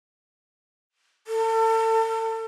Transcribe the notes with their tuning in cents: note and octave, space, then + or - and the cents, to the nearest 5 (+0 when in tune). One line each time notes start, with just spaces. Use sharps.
A4 +35